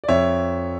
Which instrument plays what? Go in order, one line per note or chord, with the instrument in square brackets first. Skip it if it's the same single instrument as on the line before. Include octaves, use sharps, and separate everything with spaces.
[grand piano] D5
F2 C#5 E5